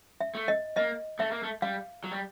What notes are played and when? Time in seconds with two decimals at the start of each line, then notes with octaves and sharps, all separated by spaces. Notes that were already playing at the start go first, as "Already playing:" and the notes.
0.21 E5
0.35 A3
0.48 D#5
0.77 A#3 D#5
1.19 A3 E5
1.31 A#3
1.43 A3
1.62 G3 F5
2.04 F#3
2.12 G3